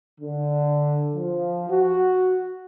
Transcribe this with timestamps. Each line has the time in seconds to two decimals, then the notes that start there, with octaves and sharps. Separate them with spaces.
0.20 D3
1.14 F3
1.70 F#4